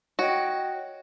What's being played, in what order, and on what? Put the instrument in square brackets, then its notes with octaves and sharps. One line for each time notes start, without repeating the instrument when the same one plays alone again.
[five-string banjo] F#4 [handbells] C#5 D#5 G5